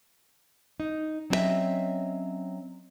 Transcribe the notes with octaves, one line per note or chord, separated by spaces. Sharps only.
D#4
F#3 C4 C#4 E4 D#5 E5